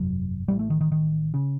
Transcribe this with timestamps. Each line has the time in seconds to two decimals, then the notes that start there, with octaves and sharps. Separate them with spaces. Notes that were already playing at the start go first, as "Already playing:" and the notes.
Already playing: G1 F2 C3 F#3
0.48 A1 A2 G3
0.59 A3
0.70 D#3
0.81 D#3
0.92 D#3
1.34 C#3